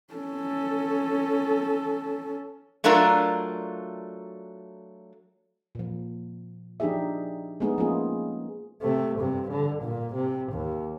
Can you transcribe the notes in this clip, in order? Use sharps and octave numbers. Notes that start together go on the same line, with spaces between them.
C#4 A4
F#3 A3 D4 F4 A#4
A#2 F3
F3 D4 D#4 G4 G#4 E5
G#3 A3 B3 D#4 G#4
F3 A#3 C4 C#4 F4 G#4
C3 A3
G2 C3
D3
A#2
C3
D#2